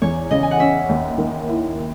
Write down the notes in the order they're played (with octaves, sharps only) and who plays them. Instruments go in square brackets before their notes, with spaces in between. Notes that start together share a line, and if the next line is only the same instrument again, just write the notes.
[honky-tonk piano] E2 [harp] C#5
[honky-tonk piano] C#3 [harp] D#5
[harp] G#5
F#5
[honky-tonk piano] C#4 [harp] E5
[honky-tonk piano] D#2
D#3
E4